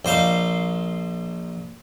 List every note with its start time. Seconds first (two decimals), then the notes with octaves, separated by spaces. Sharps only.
0.05 A#1 C5 D#5 F5